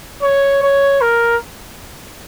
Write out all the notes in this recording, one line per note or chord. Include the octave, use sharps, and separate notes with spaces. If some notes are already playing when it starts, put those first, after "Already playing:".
C#5
C#5
A#4